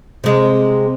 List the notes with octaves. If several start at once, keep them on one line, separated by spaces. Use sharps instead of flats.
C3 G#3